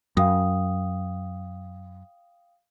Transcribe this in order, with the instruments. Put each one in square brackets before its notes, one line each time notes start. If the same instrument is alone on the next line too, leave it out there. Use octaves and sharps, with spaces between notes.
[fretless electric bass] F#2 [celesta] F5 G5 D#6